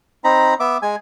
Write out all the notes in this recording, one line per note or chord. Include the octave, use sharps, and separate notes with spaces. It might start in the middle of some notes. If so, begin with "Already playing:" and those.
C4 D#4 A#5 B5
B3 E5 D6
G#3 G#5